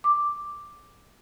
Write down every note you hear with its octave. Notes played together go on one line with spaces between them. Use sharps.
D6